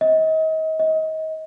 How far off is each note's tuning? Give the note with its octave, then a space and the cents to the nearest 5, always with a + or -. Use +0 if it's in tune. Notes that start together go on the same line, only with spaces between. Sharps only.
D#5 +35
D#5 +30